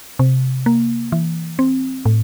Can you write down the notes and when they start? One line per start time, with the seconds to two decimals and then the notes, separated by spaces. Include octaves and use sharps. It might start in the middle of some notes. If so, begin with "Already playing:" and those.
0.19 C3
0.66 A#3
1.12 E3
1.59 C4
2.06 A2